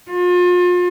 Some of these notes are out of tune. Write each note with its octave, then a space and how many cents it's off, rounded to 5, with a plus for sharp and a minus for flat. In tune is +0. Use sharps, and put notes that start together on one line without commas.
F4 +35